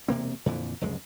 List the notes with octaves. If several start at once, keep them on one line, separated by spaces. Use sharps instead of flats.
E1 C3 A#3 C4
F2 A#2 D3 E3
F1 C#2 F#2 G#3